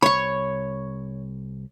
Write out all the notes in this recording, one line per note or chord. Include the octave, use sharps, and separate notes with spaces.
C2 C#5 B5 C#6